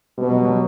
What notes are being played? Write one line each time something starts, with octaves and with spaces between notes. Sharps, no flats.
B2 G3
F#3
F#3